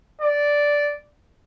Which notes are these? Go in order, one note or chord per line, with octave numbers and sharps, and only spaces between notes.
D5